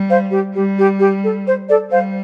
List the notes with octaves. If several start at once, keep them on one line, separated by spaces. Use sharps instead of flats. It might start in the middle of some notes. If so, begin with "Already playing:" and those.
Already playing: G3
C5 F5
G4
G3 G4
G4
G4
A4
C5
A4 D5
G3 C5 F5